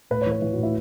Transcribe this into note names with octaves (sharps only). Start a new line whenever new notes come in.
A2 B4
C#5
E3
B4
E3
F#4
A2
E4